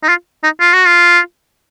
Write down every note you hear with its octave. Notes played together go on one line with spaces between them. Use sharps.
D#4
F4
D#4
F4
F#4
F4